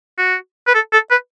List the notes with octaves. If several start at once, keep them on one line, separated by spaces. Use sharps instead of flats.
F#4
B4
A4
A4
B4